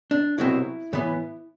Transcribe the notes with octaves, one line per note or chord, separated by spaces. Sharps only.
D4
C2 B2 F#3 C4 E4
A2 E3 B3